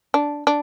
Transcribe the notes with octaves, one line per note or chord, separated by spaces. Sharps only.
D4
D4